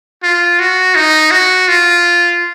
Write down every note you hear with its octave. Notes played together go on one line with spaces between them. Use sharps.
F4
F#4
D#4
F#4
F4